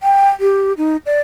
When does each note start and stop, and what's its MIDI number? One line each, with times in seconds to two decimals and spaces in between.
0.03 0.29 79
0.40 0.73 67
0.77 0.96 63
1.06 1.21 74